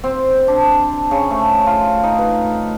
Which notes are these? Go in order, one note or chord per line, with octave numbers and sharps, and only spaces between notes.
C4
D4
C#3
A3
F4
D#4
B4